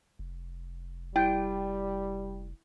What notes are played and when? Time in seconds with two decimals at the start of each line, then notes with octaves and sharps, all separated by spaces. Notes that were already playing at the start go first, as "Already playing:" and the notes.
0.19 F1
1.16 G3 E4 G5